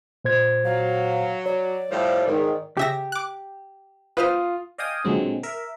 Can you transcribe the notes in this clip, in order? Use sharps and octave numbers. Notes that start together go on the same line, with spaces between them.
A#2 C5 G#6
F#3 F5
C#5 D5
A2 F3 G3
G#2 D#3
C#3 G4 E5 A#6
D6 F#6
F4 B4 C5 D#6 F6
D5 D#5 F5 G5 G#5 D#6
A#2 D3 F#3 G#3 C4
A#4 E5